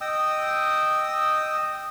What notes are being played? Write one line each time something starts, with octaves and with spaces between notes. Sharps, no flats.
D#5 G5 D#6 E6